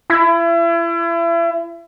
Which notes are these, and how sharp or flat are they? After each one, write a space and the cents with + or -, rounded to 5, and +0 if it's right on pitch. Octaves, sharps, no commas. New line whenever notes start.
E4 +35